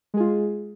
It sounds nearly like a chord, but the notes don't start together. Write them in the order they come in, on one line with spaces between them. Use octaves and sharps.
G#3 G#4 F4